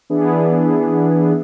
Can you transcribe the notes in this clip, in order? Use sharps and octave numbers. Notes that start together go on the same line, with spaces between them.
E3 B3 D4 E4 G#4